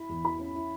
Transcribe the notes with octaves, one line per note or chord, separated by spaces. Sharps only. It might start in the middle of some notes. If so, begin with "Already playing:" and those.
Already playing: E4 B5
E2
E3 B5
C#4
E4